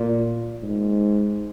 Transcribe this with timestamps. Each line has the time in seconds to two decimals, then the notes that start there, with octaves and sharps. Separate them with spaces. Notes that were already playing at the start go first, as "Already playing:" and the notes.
Already playing: A#2
0.63 G#2